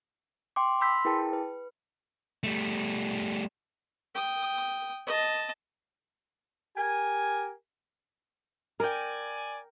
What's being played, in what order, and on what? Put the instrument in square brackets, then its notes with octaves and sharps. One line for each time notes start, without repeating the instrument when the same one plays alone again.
[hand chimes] G5 C6 D6
B5 C6 E6 G6 B6
E4 G#4 A#4 B4 G5 A5
B4
[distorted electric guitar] G3 A3
[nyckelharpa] G5 D#6
D#5 A5
[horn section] G4 A#4 G#5
[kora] A#4 G5 [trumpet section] D5 G#5